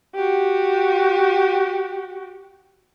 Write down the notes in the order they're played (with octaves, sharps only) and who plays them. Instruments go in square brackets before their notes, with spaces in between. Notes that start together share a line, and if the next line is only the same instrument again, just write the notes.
[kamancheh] F#4 G4